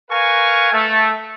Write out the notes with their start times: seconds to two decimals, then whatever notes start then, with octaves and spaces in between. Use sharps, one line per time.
0.10 A#4 B4 F5 G#5 C#6
0.73 A3